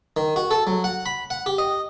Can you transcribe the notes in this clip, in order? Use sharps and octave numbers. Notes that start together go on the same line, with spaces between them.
D#3
F#4
A4
F#3
F#5
B5
F#5
G4
D#5